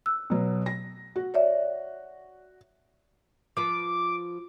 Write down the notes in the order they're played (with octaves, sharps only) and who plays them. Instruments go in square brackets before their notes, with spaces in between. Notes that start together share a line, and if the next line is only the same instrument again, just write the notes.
[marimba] E6 F#6
[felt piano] B2 F#3
A#6
F#4
[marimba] C#5 D5 E5
[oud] F3 B4 [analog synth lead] D6